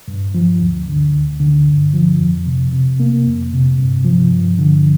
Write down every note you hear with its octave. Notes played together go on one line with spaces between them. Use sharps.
G2
F3
D2
D3
D2
D3
G2
F3
F2
C3
C3
A#3
F2
C3
G2
F3
G2
D3